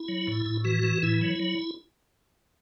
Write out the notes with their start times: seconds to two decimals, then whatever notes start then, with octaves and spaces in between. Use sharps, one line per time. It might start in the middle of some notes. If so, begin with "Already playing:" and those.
Already playing: E4
0.08 F#3
0.27 A2
0.45 A2
0.64 E3 F#4
0.83 E3
1.02 A2 E4
1.21 F#3
1.39 F#3